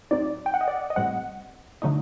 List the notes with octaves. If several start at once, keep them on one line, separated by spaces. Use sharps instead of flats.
A2 F#3 C4 D#4 D5
G5
F#5
D#5
D5
D#5
A2 G3 C4 F#5
D3 F#3 A3 D#4